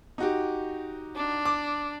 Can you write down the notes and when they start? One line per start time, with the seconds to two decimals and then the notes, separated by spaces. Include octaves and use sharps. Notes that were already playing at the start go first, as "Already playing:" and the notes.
0.18 D#4 F#4 G4
1.16 D4
1.45 D6